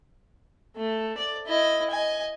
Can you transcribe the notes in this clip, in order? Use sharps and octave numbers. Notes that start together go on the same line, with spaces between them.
A3
D5
E4 D#5
D#5 G#5